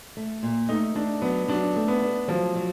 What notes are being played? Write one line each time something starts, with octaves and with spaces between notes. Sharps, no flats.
A3
A#2
A3 D#4
A3 D4
F#3 B3
F#3 D4
A3
B3
D4
F3 F#3
F#3